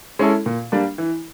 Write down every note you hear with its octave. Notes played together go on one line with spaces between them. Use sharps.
G#3 C#4 E4 A4
A#2
G3 A#3 D4
E3